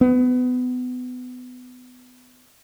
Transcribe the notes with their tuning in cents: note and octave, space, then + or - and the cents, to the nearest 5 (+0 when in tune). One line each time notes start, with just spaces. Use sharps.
B3 +25